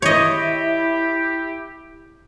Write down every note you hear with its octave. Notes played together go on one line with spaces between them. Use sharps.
E4 G4 C#5 D#5